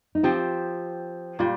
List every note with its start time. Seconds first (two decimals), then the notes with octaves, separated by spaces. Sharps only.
0.15 D#4
0.23 F3 C4 F4 G4
1.39 A#2 G3 F4